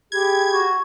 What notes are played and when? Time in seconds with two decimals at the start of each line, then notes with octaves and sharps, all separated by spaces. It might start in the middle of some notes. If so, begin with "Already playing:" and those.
0.12 G4 G#4 B5 G#6
0.53 F#4